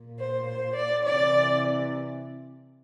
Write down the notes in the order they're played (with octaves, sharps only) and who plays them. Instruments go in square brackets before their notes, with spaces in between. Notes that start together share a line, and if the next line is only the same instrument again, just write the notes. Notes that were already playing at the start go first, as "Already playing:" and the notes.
Already playing: [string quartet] A#2
C5
C5
D5
C3 E3 D5